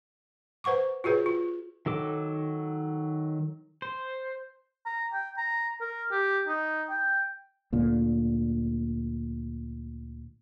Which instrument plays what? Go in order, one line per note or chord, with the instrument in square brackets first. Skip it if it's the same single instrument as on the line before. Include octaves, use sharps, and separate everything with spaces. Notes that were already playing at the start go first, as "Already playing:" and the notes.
[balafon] B4 C5 F#5 C#6 D6
F4 F#4 G#4 B4 C#5
F4
[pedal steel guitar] D#3 F#3 A4 D6
C5
[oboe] A#5
G5
A#5
A#4
G4
D#4
G5
[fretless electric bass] D2 A#2 D3